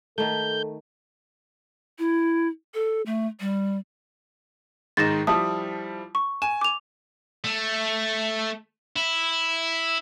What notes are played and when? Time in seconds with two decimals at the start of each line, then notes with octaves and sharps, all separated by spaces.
0.18 D#3 A3 A4 G6
1.99 E4
2.74 A4
3.06 A3
3.40 G3
4.97 G#2 D#3 D#4 A6 A#6 E7
5.27 F3 G3 E4 A5 D#6
6.15 C#6
6.42 G#5 E7
6.61 D6 F7
7.44 A3
8.96 E4